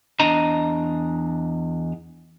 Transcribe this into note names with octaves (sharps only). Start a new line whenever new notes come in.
E2 D4 D#5 A#5